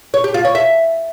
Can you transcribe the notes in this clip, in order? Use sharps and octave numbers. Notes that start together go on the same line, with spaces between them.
C#5
G4
F4
C#5
E5